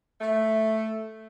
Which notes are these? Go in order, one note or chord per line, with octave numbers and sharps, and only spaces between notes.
A3